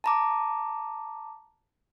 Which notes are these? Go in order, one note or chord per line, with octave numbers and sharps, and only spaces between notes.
A5 A#5 D6